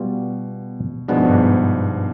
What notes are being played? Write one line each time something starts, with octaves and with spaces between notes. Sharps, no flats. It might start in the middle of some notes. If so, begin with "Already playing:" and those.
Already playing: B2 G3 B3 F4
B2 F3 G#3 B3 D4
G#2
G2
G#2